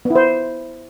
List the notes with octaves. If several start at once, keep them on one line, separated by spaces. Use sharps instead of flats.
B3
E4
C5